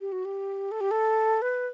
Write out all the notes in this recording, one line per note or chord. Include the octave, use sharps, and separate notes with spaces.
G4
F#4
G4
A4
G4
A4
B4